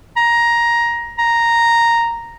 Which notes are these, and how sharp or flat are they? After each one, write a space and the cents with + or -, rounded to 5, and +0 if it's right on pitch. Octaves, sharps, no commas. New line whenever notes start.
A#5 +15
A#5 -5